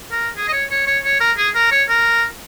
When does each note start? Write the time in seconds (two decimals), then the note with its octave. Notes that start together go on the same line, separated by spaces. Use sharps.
0.11 A#4
0.37 G#4
0.48 D#5
0.53 C#5
0.70 C#5
0.87 C#5
1.04 C#5
1.20 A#4
1.37 G#4
1.55 A#4
1.72 C#5
1.89 A#4